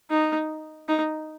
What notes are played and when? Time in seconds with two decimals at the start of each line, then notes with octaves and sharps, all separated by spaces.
0.11 D#4
0.88 D#4